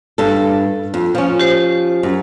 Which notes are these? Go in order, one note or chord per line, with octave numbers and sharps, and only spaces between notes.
G2 A4
F2
F3 C#4
G4 C5
F#2